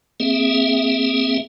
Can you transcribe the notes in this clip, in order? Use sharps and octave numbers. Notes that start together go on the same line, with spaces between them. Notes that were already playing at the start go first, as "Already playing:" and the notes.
A#3 C4 G#4 E5